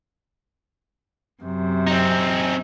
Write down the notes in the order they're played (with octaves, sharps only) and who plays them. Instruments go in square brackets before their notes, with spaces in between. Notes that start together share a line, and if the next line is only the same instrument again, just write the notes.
[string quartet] F#2 C3
[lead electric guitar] C4 D#4